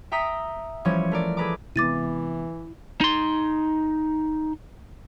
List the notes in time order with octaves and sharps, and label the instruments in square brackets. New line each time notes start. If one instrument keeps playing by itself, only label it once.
[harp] E5 G5 A#5 D#6 B6 C#7
E3 F3 G3 C#4 C#5
A3 A#4 D5
G#4 A4 B4 A#5 D6
[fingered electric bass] C3 G#3 B3 [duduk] E3 [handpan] E4 [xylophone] D6 A6 D#7
[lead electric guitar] D#4 C6